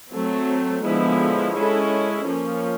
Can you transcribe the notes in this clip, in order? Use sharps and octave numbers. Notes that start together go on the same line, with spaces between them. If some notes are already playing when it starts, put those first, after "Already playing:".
F#3 A3 C4
D3 F3 G#3 B3 E4
G#3 C#4 E4 A4
F3 A#3 C#4